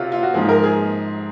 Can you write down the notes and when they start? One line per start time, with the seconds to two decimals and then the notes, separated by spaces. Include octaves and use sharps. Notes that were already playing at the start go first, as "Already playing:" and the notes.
Already playing: C3 F#3 F4 F#4
0.12 F4
0.23 F#4
0.34 G#2 F3 G#3
0.49 A#4
0.63 G#4